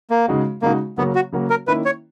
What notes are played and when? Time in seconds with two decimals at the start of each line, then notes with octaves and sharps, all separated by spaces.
0.10 A#3
0.28 C#3 G#3 D#4 F#4
0.62 C#3 G#3 A#3 D#4 F#4
0.98 C#3 F#3 A#3 B3 C#4 F#4
1.15 F#4
1.32 C#3 F#3 A#3 C#4 F#4
1.50 A#4
1.67 D#3 A#3 C#4 E4 B4
1.85 C#5